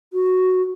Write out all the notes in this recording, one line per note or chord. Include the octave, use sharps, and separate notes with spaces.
F#4